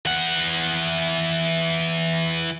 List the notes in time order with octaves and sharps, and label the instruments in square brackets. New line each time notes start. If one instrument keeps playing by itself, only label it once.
[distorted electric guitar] E3 F#5